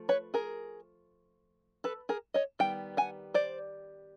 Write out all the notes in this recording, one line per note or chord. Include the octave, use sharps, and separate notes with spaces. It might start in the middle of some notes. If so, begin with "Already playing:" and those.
Already playing: F3 A3
B4 C#5
G#4 A#4
A4 B4
G#4 A#4
C#5 D#5
D#3 G3 B3 G5
F#5 G#5
C5 D5